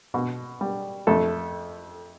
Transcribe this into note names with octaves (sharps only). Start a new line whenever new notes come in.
B2
G3
F2 A3 A4